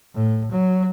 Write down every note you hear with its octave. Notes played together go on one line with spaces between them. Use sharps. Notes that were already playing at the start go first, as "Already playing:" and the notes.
A2
F#3